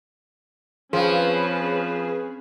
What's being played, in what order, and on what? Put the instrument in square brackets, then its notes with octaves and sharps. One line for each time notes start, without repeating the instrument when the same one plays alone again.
[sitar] F3 [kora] C4 [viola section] C#4 B4 [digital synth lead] G#4